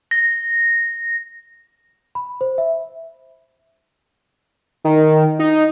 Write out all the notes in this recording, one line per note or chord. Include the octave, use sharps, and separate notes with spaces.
A#6
B5
C5
E5
D#3
D#4